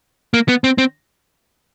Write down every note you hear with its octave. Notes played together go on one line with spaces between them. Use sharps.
A#3
B3
C4
C4